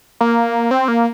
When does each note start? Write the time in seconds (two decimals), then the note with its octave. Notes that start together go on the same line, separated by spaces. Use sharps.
0.21 A#3
0.71 C4
0.88 A#3